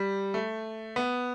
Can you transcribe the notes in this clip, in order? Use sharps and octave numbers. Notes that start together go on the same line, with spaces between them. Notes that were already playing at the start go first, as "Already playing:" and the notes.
Already playing: G3
A3
B3